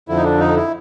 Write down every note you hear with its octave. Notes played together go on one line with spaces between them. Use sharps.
F2 D3 F3 E4
D#4
D4
D#4
E4